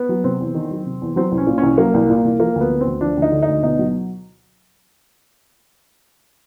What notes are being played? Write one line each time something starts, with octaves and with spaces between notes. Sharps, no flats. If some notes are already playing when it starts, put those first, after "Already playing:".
Already playing: B3
F#3
C3 C4
E2
D#3
F#3
C3
E2
F#3 C4
C2
C#4
A#2
C2 C#4
F#3 A#3
C2
A#2
C2
F3 A#3
D2 B3
D3
C4
D2
F3 D4
D2
D#4
D3
D#4
D2
B2 D#4
F#3